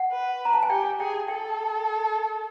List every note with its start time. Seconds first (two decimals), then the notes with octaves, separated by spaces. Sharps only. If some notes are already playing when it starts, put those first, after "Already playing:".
Already playing: F#5
0.12 B4
0.45 A#5
0.53 A5
0.63 G#5
0.70 G4 G5
1.00 G#4 G5
1.28 A4 G5